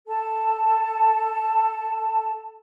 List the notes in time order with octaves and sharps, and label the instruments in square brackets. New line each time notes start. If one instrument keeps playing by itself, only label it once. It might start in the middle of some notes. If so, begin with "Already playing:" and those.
[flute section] A4 A5